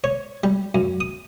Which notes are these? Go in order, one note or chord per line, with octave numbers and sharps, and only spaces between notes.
C#5
G3
F#2
D#6